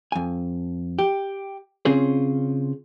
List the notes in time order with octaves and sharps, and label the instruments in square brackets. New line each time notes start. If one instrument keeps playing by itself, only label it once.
[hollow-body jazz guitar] F2 G#5
G4
C#3 C4 C#4 F4 G#4 C5